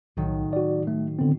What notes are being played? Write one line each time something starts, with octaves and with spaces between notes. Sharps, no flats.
B1 A2 D#3 F#3
F#4 D5
A3
D3 B3 C4